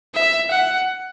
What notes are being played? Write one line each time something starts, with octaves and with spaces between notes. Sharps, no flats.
E5
F#5